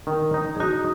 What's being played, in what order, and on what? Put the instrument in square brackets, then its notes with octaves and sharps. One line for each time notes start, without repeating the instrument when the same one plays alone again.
[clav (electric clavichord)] D#3
D#4
[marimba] G#4
[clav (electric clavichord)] D#4 [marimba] F#4